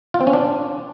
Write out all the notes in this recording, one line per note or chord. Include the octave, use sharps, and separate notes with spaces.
F4
C4
C#4
D4